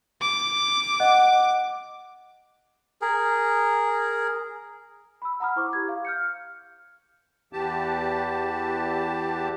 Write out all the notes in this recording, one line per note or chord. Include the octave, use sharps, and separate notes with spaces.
D6
D#5 F#5 F#6
G#4 A#4
B5 E6
F#5 A#5 B5 D#6 F6
E4 C5 C#6 D6
G4 G#6
F5
F6 G6 C#7
E2 E3 G4 A5